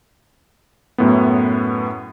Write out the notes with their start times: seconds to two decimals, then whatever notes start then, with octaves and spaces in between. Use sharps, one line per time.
0.98 F#2 A2 B3